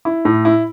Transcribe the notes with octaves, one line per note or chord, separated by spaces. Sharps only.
E4
A2
E4